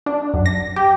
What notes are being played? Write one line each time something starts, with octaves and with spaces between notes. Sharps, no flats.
D4
F#2
A#6
G4